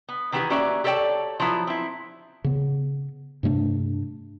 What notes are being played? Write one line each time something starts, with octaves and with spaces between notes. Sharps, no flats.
B3
D#3 E3 B3 C4 G4 G#4
A#3 C#4 F#4 G4 D5 E5
G4 A4 C#5 D5 G5 A5
F3 F#3 B3 E4
C4 E4
C#3 B3
G2 C3 A3 D4